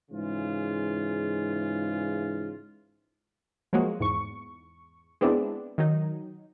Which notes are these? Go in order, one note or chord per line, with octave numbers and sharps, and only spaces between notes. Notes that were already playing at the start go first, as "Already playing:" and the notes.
G#2 C#3 E3 F4
F3 F#3 G#3 A#3 F#4
E2 G#2 C#6
G#3 B3 C4 D4 E4
D#3 F#3 D#4